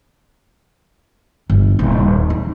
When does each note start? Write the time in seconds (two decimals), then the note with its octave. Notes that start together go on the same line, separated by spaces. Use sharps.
1.50 G1
1.79 D#1
2.30 D#4